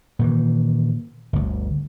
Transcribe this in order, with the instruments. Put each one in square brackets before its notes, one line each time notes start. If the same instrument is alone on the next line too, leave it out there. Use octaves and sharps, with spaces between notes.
[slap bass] A#2 D#3 E3
G1 D2